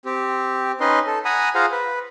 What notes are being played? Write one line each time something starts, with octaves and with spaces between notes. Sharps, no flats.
C4 G4
C#4 D#4 B4 D#5 C6
A4
F#5 G#5 A#5 B5 D#6
F4 G#4 C5 F5 F#5 A#5
B4